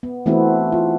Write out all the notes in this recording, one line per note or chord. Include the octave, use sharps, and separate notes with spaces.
B3
E3 A3 B3 C4 E4 F#4
F4